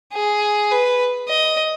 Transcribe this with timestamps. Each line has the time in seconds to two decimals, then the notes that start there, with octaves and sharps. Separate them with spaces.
0.13 G#4
0.71 B4
1.29 D#5